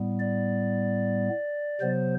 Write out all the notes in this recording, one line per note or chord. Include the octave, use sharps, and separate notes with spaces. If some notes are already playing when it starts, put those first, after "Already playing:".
Already playing: A2 G3 B3
D5
C3 F#3 B3 C5